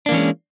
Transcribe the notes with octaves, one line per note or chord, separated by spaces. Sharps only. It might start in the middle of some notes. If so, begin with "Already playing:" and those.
E3 G#3 A#3 C#4 D4